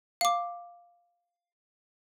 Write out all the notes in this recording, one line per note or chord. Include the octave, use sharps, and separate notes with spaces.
F5 D6